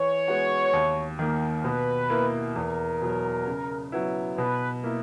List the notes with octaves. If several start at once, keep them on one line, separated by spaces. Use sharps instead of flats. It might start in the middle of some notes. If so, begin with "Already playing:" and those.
Already playing: E3 C#5
G#3 B3 F#4
D#2
D#3 A#3
B2 B4
A#3 E4
E2 A#4
B2 F#3
C#3
F#3 B3 E4
B2 B4
A#3 E4